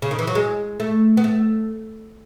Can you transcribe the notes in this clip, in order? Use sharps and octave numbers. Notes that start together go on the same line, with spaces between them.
C#3
D#3
E3
F#3
G#3
A3
B3
A3